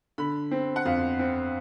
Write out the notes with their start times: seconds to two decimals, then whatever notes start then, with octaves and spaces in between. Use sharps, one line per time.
0.18 D3 B5
0.51 C4
0.76 F#5
0.85 F2 F5
1.19 C4